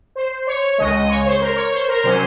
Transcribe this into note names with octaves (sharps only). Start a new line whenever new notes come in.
C5
C#5
C#2 C#3 G#3 D#5
D#5
C#5
C5
A#4
C#5
C5
A#4
C3 F#3 C#4 C5